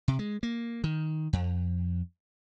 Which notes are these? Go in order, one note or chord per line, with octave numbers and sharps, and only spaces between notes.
C3
G#3
A#3
D#3
F2